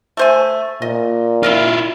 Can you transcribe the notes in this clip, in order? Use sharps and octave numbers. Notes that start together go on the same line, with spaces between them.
A3 C5 G#5
A#2 D#5
E4 F4 A#4 D#5 E5